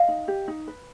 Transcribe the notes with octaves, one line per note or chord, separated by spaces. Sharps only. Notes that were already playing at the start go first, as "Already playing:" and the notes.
Already playing: D#5 F5
D#4
G4
D#4
B4